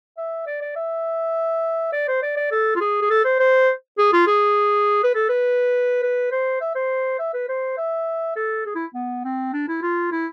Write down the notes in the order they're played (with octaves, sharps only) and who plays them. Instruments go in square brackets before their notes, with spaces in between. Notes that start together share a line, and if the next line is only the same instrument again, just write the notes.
[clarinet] E5
D5
D5
E5
D5
C5
D5
D5
A4
F4
G#4
G#4
A4
C5
C5
G#4
F4
G#4
B4
A4
B4
B4
C5
E5
C5
E5
B4
C5
E5
A4
G#4
E4
B3
C4
D4
E4
F4
E4